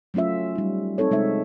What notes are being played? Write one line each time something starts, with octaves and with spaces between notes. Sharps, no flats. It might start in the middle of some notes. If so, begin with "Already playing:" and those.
F#3 A3 C#4 F4 E5
G3 D#4
C4 D#4 A4 C#5
C3 G#3 D#4 E5